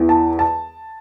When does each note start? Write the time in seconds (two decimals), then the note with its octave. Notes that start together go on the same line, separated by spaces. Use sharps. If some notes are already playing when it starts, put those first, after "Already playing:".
Already playing: E2 E3
0.09 A5
0.39 A5